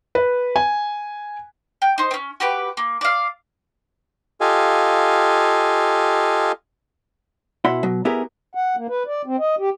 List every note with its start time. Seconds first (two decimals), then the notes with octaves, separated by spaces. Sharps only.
0.15 B4
0.56 G#5
1.82 G5
1.98 D#4 C5
2.11 C4 C#4
2.40 F#4 G4 B4 D6
2.77 A#3
3.01 D5 F5
4.41 F4 G4 A4 D#5 F5 G#5
7.65 B2 E4 F#5 B5 C6
7.83 B2 F#3
8.05 B3 E4 G4 G#4 A#4
8.55 F#5
8.76 A#3
8.89 B4
9.07 D5
9.26 C4
9.39 D#5
9.59 G4